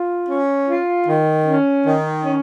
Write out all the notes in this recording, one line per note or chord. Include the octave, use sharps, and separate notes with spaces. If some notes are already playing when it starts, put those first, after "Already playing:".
Already playing: F4
C#4
F4
D#3
C#4
D#3
C#4